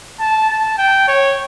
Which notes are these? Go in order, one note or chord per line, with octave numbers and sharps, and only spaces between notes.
A5
A5
G5
C#5